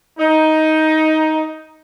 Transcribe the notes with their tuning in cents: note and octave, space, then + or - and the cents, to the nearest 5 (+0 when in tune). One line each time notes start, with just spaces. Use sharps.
D#4 +10